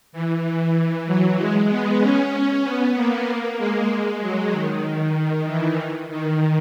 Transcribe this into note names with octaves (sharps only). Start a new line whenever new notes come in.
E3
E3
F#3
G#3
B3
C#4
B3
A#3
A#3
G#3
F#3
D#3
D#3
D#3
E3
D#3